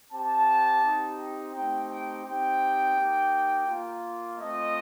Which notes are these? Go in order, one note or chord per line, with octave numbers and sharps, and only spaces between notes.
C4 G4 A5
C4 D#4 G4
A3 C4 D#4 G4 G5
G5
C4 D#4 G4 G5
A#3 D#4 G4
A#3 F4
A3 C4 F4 D#5